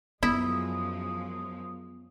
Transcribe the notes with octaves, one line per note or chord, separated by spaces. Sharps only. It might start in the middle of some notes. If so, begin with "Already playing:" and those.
F#2 F3 G#3 B3 E4 D#6